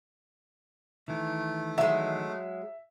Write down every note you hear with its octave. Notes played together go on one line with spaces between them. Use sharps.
D#3 E3 A3
F#3 G#3 E5